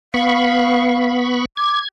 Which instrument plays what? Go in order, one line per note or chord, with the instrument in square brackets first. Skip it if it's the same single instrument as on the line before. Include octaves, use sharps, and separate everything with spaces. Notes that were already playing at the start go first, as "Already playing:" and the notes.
[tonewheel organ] B3 B5 C#6 [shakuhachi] F5
[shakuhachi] D6 [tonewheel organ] G#6